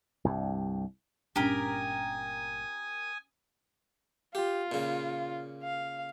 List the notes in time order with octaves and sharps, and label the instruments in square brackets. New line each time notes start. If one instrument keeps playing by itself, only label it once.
[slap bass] C2 G2
[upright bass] G1 A#2 [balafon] C#4 D4 [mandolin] G4 A#4 [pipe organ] G#5 D#6
[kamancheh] F4 [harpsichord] G4
[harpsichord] A#2 C#3
[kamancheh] F5